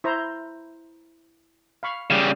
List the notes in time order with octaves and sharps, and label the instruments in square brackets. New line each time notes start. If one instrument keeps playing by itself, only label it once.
[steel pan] E4 C5 A#5
F5 B5 C#6
[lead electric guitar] C#3 G3 [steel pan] F5